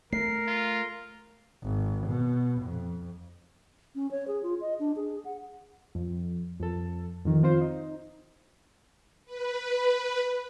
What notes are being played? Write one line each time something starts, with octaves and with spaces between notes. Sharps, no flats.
A3 A#4 C7
F4
G#1
B2
F2
C#4
C#5
G#4
F4
D#5
D4
G#4
F#5
F2
F2 A4
F2 D#3
C4 F4 C5
D#4
B4